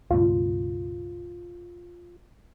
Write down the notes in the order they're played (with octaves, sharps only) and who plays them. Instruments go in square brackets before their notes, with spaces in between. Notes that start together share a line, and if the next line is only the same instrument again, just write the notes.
[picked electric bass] C#2 G2 B2 [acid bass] F4